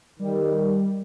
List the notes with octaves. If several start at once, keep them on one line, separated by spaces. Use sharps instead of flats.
D#3 G3